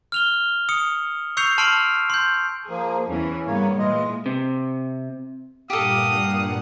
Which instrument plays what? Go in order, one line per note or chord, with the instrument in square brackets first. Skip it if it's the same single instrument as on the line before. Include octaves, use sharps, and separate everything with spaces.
[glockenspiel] F6 F7 G7
D#6 C#7
C#6 E6 G6 C7 C#7 F7
A5 C6 F6 C7 D7 F7
C6 G6
[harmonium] F3 A#3 [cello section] G#4
[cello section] E2 E3 [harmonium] C#4
[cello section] G2 B3 [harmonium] C#3 A#3 C#5
[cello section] A#2 G#3 [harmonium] E3 F4 D#5
[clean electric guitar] C3
[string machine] G2 A#2 F#5 [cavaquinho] G4 A4 [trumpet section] A#4 F5 D#6